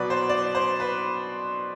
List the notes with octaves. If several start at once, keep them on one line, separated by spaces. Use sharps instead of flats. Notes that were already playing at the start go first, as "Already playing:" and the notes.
Already playing: B2 F#3 B4 D5
C5
D5
C5
B4